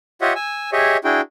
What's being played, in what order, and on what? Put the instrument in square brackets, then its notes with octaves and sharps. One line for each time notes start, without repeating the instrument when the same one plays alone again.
[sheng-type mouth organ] F4 G4 C#5 D#5 E5 F#5
G#5 E6
G4 G#4 C#5 D#5 E5
D4 E4 F#4 G#4 G5